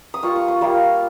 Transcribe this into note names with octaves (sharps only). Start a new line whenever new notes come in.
D#6
G3 A#3 F4 C#6
C#6
C#6
G3 A#3 F4